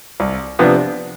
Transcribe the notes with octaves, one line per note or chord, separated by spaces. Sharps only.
C2
C3 F3 B3 D4